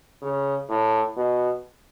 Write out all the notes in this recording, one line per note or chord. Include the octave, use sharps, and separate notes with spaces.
C#3
A2
B2